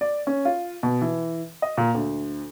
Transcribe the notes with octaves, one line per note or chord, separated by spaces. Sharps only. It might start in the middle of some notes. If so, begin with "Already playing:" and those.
D5
C#4
F4
B2
E3
D#5
A#2
D2